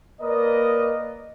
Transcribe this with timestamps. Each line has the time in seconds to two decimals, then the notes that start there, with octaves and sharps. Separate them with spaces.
0.21 A#3 A#4 B4 D5 D#5